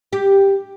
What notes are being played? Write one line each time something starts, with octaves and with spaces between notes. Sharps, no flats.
G4